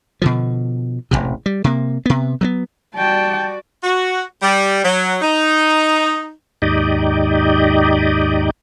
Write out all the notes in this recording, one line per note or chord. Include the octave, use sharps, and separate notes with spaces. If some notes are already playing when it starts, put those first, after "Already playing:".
B2 D3 F3
E1 A1 E2 C3
G3
C3 A#3
C3 B3
F#3 G#3 B3
G3 F#4 D5 G5 A5
F#4
G3
F#3
D#4
D#2 G#2 D#4 G4 D5 D#5